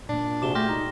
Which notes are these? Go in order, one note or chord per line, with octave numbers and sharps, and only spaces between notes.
A#2 A#3 D4
C3 F#4 G#4 D5 D6 E7 G7
A3 G4 C6 F6 A#6
D#4 A#5